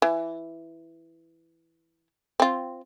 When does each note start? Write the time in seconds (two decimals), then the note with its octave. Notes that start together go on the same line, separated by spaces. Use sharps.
0.02 E3
2.40 C4 F4